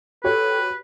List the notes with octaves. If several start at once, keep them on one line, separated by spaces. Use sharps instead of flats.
F#4 G4 A4 B4 C#5